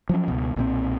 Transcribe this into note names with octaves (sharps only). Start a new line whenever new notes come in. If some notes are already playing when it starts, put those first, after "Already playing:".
F3 F#3 C#4
C#2 B2
B1 A#2 D#3 C4